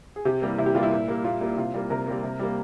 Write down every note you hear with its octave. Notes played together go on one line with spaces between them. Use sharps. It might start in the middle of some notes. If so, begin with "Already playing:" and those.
G#4
C3 G4
E3 G3 A#3
C3 E4
G4
E3 G3 A#3 F4
E4
A#2
G3 A#3
A#2 F4
G3 A#3
C3 F4
G3 A#3
C3 A#4
G3 A#3
C3
G3 A#3